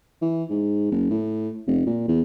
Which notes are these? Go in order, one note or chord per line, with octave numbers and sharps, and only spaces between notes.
E3
G#2
F#1
A2
F1
A#2
E2